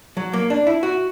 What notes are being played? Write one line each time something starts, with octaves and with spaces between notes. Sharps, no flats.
F#3
A#3
D4
E4
F#4